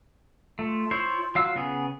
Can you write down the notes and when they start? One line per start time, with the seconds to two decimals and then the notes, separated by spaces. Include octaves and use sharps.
0.59 A3 F4
0.91 E4 C5 C#5
1.35 F#3 F5 E6
1.56 C#3 B3 G#4